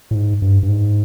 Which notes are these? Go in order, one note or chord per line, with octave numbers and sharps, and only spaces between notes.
A2
G#2
G2
G2
G#2